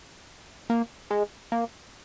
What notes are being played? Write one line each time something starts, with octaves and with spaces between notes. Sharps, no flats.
A#3
G#3
A#3